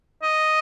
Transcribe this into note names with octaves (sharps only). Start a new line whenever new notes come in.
D#5